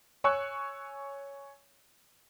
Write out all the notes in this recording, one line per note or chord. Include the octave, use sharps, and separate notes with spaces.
C#5 G#5 C#6 E6 F#6